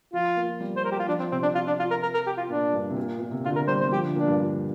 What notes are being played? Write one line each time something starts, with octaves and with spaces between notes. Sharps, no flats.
F3 F4
A#3
G3
C5
A#4
G4
F4
F3 D4
C4
C3 C4
D4
F4
D4
F4
A#4
A#4
A#4
G4
F4
A#2 D4
G2
C3
A#2
A#2
C3
D3 F4
A#4
A#3
G3 C5
C5
G3
F3 G4
D3
A#2 D4
G2
A#2